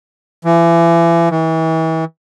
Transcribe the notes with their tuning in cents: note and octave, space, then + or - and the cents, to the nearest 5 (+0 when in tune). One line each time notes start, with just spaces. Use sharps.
E3 +35
E3 -35